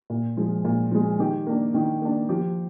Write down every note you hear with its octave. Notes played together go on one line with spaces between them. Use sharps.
A#2
F3 G#3
A#2
F3 G#3
D#3 G4
A#3 D4
D#3
A#3 D4
F3 G4